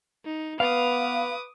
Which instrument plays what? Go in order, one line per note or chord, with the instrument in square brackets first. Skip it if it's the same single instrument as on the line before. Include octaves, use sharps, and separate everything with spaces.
[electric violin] D#4
[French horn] B3 [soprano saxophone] B4 [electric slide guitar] F5 [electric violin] D6 D#6